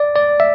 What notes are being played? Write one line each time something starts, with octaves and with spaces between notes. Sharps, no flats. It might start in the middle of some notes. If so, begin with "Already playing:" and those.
Already playing: D5
D5
E5